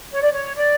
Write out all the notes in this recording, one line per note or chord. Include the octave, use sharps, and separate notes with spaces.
C#5
D5
C#5
D5